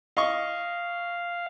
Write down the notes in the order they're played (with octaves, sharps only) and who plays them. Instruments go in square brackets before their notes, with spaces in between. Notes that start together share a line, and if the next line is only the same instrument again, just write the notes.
[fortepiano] D#5 C#6 [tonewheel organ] F5